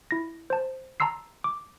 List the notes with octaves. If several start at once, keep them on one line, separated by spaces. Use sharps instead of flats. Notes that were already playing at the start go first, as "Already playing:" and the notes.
E4 A#6
C5 A5
A5 A#5 C6 E6 C7
D6